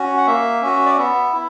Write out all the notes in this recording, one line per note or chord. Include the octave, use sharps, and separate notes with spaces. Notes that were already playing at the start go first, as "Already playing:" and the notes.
Already playing: C#4 F#4
F#5
A#3 E5
C#4 F#4
D5
B3 E5
E4